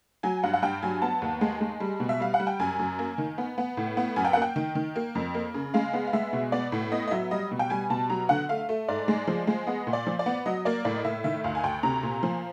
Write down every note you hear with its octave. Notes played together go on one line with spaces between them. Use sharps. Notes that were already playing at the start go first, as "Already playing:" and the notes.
F#3 G#5
G2 F#5
F#5
G2 G5
F#3 G#5
B3 A5
D#2
G#3
G#3
G3
B2
E5
G3 F5
F#5
G3
G5
F#2 G#5
F#2
A#3
D#3
B3
B3
A2
B3
F#2 G#5
G5
A#3 F#5
G5
D#3
D#3
A#3
F2
A#3
C#3
G#3 F5
B3
F5
G#3 E5
B2
B3 D5
A2
B3 D#5
D#5
F#3 E5
G3 D#5
B2
G5
G3 G#5
B2 A5
F#3 A#5
D3 F#5
A3 F5
A3
G#2 D5
G#3
F3
G#3
B3 D#5
A#2
D5
F3
D5
B3
F#3 D#5
A#3 D5
A2 D5
D#5
A2 E5
D#3 E5
D2 F5
G#5
D2 G5
C3 A#5
A#2
F3